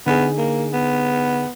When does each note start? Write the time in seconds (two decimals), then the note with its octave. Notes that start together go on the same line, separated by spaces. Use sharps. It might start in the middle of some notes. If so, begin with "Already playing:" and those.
0.07 D3 B3 D#4 G#4
0.38 A#3
0.73 B3